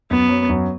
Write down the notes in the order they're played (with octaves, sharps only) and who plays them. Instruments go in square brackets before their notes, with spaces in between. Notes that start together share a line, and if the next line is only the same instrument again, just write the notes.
[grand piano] F#2 [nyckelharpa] B3
[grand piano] F#3
F#2